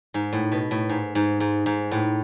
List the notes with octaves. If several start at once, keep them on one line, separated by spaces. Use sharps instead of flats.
G#2
A2
B2
A2
G#2
G#2
G#2
G#2
A2